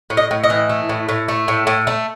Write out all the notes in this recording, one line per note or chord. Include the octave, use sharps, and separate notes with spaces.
A2
D#5
A2
D#5
E3
A3
A2
A2
A3
A2
A2
A3